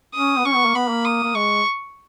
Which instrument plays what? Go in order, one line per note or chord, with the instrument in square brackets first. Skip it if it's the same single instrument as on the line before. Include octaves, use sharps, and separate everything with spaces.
[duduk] C#4 [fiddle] D#6
[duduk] B3
[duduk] C#4 [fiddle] C#6
[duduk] B3
A#3
[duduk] B3 [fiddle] B5
[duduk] A#3
[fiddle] D#6
[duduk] A#3
[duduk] G#3 [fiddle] C#6